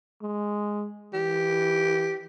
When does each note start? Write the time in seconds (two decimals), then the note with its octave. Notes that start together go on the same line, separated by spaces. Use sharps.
0.22 G#3
1.13 E3 G4